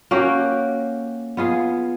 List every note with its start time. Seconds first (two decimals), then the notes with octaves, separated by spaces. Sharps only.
0.11 A#3 C#4 F#4 G4
1.37 B3 F4 G#4